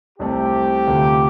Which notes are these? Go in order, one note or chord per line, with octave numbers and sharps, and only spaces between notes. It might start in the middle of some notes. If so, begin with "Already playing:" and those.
C2 C3 A3 C4 G4 A4
D2 C3 A3 F4